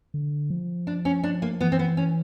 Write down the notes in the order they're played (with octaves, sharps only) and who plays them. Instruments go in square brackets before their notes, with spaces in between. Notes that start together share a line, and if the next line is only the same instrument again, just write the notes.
[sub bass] D3
F3
[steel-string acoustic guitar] D4
C#4
D4
A#3
[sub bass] E3 [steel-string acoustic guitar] B3
[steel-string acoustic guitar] C4
B3
C#4